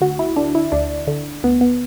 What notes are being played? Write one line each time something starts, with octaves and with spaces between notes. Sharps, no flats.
D2 F#4
E4
D3 D4
E4
D2 D4
D3
D2 B3
B3